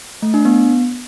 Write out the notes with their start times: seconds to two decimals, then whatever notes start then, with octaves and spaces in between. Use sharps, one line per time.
0.22 A3
0.34 D4
0.45 B3